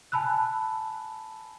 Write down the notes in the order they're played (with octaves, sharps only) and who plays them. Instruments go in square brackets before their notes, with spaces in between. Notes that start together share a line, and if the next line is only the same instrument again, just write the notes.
[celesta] G#5 A5 B5 E6 F#6